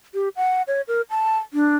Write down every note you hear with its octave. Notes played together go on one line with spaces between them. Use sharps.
G4
F#5
C#5
A#4
A5
D4